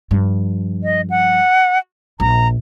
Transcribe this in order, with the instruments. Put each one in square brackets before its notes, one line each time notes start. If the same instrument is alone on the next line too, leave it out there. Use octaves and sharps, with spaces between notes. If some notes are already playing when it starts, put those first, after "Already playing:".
[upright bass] G2 F3
[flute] D#5
F#5
[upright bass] A#1 [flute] A#5